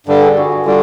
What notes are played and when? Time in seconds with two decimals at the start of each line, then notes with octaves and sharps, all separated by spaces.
0.07 G2 D3 G3
0.21 G#4
0.37 F#4
0.52 F#4
0.66 D3 G3 F4